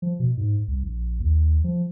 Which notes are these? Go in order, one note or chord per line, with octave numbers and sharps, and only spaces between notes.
F3
B2
G#2
C2
A#1
D#2
F3